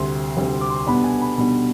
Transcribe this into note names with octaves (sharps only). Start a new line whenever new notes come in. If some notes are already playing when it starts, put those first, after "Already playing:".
Already playing: D2 C3 G3 C4 C6
D2 C3 G3 C4
D6
C6
B2 G3 B3 D4 B5
G#5
B5
B2 G3 B3 D4 B5